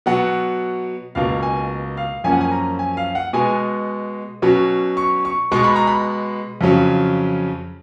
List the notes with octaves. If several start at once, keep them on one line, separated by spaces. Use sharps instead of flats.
B2 F#3 B3 F#5
C#2 B2 A#3 F5
G#5
F5
F#2 F3 A#3 C#4 G#5
F#5
G#5
A#5
G#5
F5
F#5
B2 G#3 B3 G#5
B2 F#3 C#4
C#6
C#6
B2 G#3 B3 C#6
B5
A#5
B5
F2 C#3 F#3 C#4